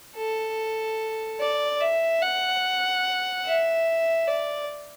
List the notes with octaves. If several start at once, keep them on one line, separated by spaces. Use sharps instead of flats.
A4
D5
E5
F#5
E5
D5